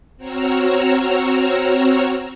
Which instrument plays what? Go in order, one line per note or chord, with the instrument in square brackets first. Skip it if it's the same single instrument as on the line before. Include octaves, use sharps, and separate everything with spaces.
[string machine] C4 F#4 C#5 A#5 E6 F6